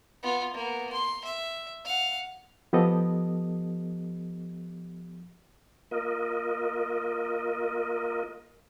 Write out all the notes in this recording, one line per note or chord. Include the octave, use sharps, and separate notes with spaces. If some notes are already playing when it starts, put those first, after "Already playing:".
B3 F4
A#3 B3
C6
E5
F5 F#5
F3 B3 G4 A4 D#5
A#3 F4 A#4 D#5